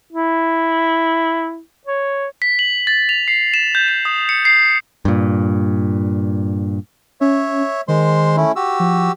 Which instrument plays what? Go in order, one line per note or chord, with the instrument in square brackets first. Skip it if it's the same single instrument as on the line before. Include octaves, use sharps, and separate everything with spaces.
[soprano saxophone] E4
C#5
[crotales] B6
F#7
A6
F7
C7
E7
G6
E7
D#6
C#7
C7
[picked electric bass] G2 A#2
[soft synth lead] C#4 [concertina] C#5 E5
[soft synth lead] D#3 [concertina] G#3 C5 C6
[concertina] A3 C#4 E4
F#4 G4 E6
[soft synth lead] F3